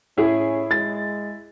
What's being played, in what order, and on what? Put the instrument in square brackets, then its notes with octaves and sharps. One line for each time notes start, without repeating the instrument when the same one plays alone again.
[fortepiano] A2 G#4 [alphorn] C#4 [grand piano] E4
[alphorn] G#3 [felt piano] A6